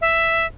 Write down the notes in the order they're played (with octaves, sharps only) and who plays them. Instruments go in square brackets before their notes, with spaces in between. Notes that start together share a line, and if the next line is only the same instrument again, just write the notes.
[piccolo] E5